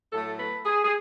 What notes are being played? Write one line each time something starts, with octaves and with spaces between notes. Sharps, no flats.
A2 F#3 A3 A4
B4
G#4
G#4